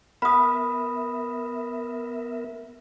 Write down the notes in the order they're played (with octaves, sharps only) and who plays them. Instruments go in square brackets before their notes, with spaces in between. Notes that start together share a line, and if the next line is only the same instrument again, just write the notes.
[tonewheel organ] B3 A#4 E5 [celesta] B5 D#6